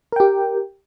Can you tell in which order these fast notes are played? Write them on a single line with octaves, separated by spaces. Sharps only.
A#4 G5 G4